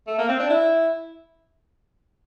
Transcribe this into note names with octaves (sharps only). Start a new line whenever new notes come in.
A3
A#3
C4
D4
E4